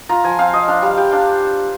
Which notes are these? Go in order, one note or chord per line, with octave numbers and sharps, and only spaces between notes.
F4 A#5
F3 G#5
C4 F5
C4 D#5
D4 F5
G3 F5
G3 G5
D4 F5